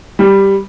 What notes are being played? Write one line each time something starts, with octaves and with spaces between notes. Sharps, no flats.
G3